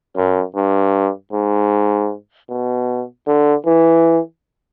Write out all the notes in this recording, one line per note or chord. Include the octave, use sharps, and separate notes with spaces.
F#2
G2
G#2
B2
D3
E3